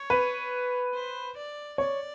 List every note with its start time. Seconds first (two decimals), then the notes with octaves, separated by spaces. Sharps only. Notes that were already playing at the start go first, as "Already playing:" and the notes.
Already playing: C#5
0.10 B4
0.94 C5
1.36 D5
1.78 C#5 D5